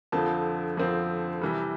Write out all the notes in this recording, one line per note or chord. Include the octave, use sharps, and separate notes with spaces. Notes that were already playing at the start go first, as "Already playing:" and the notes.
F2 D3 F3 C4 A5
F2 D3 F3 C4
C3 E3 G3